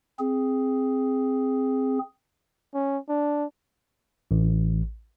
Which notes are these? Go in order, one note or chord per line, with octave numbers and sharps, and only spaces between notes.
C4 G#4
C#4
D4
A1